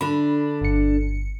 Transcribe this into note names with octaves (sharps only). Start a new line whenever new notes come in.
D3 D4 B5
G1 C#7